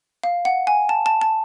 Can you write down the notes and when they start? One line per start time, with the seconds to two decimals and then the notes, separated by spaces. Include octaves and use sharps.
0.24 F5
0.45 F#5
0.67 G#5
0.89 A5
1.06 A5
1.21 A5